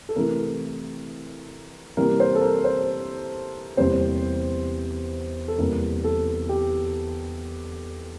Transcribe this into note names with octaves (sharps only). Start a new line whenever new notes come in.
A4
C3 E3 A3 A#4
C3 E3 G3 A#3 A#4
C5
A4
A#4
C5
E2 C3 G3 A#3 C5
A4
E2 C3 G3 A#3 A#4
A4
G4